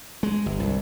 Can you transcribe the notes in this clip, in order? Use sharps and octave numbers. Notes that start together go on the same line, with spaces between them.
G#3
G1
C2